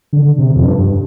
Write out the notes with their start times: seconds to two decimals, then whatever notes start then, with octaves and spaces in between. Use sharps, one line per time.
0.13 D3
0.39 C3
0.56 F2
0.65 G2